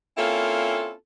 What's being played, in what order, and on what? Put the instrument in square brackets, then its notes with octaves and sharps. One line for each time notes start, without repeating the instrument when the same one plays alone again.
[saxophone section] A#3 C4 C#4 E4 F4 A4